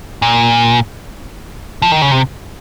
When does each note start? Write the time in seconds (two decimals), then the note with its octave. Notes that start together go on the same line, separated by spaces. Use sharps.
0.22 A#2
1.82 F3
1.92 D#3
2.02 C#3
2.11 C3